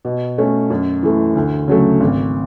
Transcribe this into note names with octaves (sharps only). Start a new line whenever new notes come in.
B2
A3 C#4
F#2
E3 A3
D2
C#3 F#3 A3
G#1